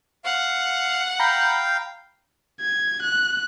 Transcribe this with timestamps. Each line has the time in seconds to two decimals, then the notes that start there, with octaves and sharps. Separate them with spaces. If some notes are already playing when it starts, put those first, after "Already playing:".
0.25 F5 F#5
1.20 F5 G5 A#5 B5 G6
2.61 G#6
3.02 F#6